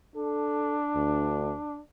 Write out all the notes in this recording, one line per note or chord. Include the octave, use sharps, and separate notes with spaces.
D4 A4
D2